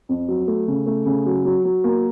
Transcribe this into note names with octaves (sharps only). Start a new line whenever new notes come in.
F2
F#3
A3
C#3
A3
C#3
F#3
F#3
F#3
A#3